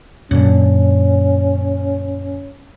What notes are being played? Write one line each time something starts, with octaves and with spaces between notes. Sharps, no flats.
F#2 A#2 D3 C#4